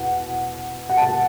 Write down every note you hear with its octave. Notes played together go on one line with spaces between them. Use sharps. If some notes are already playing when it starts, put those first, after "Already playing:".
Already playing: E2 B2 F#5
F#5
A5